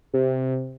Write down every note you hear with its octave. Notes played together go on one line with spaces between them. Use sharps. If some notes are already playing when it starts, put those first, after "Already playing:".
C3